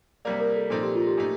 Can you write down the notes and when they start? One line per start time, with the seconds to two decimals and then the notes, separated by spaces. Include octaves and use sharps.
0.25 C3 G3 A#3 D5
0.41 A#4
0.55 A4
0.70 A#2 F3 C4 D#4 A4
0.83 G4
0.95 F4
1.07 G4
1.17 A#2 F3 A3 D#4